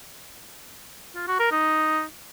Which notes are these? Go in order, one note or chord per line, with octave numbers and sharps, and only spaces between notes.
F4
F#4
A#4
D#4